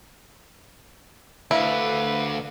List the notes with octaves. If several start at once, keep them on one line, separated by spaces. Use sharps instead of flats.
D2 D3 E4 B4 F5